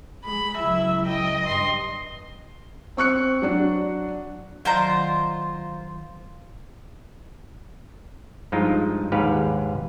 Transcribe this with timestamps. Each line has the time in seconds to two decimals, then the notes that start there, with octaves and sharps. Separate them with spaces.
0.25 G#3 B5
0.57 C#2 F#3 E4 E5
1.06 D#5 G5
1.46 G2 C6
2.97 C4 C#6 F#6 C#7
3.42 F#3 D4 F#4
4.65 D#3 F#3 F4 C5 D5 A#5
8.52 G2 F3 G#3 D#4 F4
9.12 A#1 D#2 G#2 G4 B4 F5